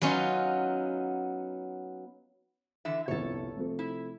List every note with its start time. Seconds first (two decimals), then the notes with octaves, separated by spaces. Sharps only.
0.02 F#3 B3 C#4 D#4 F4
2.85 D3 E3 E5
3.08 G1 C2 F2 A4 C#5
3.57 C3 F3 A3
3.79 E4